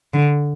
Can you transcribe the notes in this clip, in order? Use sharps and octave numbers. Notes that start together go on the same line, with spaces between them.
D3